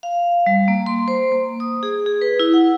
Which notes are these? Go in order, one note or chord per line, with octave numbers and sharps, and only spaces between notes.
F5
G3
A#3
C6
C5
A#3
D#6
G#4
G#4
B4
E4
F#5